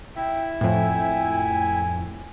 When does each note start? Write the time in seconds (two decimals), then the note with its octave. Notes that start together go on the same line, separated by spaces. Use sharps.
0.16 E4 E5 G5
0.61 F2 A2 G5 G#5